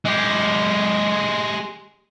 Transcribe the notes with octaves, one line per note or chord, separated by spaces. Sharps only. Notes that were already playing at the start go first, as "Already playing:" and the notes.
G#3 G4